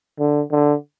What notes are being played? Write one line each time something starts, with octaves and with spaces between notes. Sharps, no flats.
D3
D3